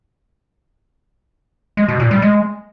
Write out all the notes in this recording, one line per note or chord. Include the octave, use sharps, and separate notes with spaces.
G#3
B2
A#2
G3
G#3